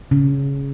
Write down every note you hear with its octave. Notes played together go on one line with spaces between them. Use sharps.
C#3